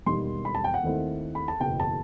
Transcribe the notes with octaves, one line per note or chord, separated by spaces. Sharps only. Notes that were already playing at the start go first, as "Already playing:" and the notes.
E1 D#2 D#3 G3 C6
B5
A5
G5
F#5
D#2 D#3 A3 C4 E4
B5
A5
F#1 E2 B2 G5
A5